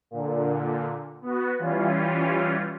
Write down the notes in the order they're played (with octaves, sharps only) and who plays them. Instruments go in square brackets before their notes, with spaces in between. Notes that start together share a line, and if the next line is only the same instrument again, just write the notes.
[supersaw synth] A#2 D3
B3 F#4
E3 G3 C#4 F4